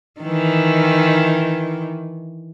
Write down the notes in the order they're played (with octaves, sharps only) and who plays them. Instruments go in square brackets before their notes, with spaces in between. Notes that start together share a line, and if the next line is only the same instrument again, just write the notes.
[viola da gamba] D#3 E3